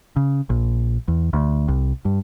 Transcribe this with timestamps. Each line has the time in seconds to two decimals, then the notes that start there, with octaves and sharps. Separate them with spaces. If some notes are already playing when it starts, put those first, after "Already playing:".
0.16 C#3
0.50 A#1
1.08 E2
1.33 D2
1.68 C2
2.05 G2